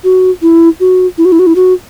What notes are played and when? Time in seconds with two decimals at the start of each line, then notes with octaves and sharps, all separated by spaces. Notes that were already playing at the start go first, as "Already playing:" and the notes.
0.04 F#4
0.42 E4
0.80 F#4
1.18 E4
1.25 F#4
1.32 E4
1.39 F#4
1.47 E4
1.56 F#4